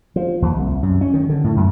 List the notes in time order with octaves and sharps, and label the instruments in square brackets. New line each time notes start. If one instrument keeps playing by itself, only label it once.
[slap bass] F3
D#2
C2
F#2
C#4
D#3
D3
A2
F#2